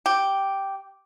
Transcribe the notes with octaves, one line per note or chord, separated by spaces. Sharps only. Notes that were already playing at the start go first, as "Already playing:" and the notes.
G4